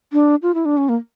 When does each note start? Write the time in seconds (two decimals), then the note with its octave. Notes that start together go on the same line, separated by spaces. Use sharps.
0.13 D4
0.43 F4
0.55 E4
0.65 D4
0.77 C#4
0.89 A#3